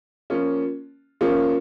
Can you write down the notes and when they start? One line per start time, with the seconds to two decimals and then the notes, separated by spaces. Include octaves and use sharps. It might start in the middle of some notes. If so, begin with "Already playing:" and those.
0.30 F3 A#3 C#4 F4
1.21 F3 A#3 C#4 F4